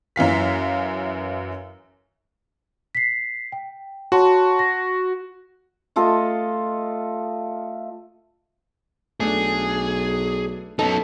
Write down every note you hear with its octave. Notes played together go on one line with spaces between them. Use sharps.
F#2 E3 F5 B6
B6 C7
G5
F#4 C#5 A5 C6
A#6
A3 F4 A4 D#5
B1 A3 D4 G#4
F#2 B3 D#4 A4